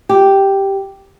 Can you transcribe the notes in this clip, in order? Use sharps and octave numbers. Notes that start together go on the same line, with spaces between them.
G4